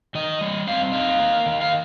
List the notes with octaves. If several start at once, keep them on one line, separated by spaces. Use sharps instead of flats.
D#3 D#5
G3
C4 F5
D#4 F5
A#3
D#3
F5